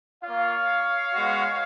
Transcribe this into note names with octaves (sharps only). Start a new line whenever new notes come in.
A#3 F4 C#5 F5
G#3 B3 F#4